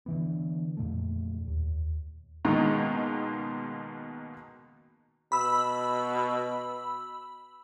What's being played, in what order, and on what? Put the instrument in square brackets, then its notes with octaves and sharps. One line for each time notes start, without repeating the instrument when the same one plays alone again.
[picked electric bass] D3 E3 B3
F2 A#2 A3
D#2
[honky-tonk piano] C#2 B2 D#3 G#3 A#3
[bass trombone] B2 [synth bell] B5 E6